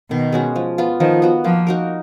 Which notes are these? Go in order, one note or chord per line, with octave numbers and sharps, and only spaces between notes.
B2 D#3
G#3 C#4 F#4
F3
B3 F4
D#3 F3
B3 F#4
F3 A#3
D#4 F#4 A#4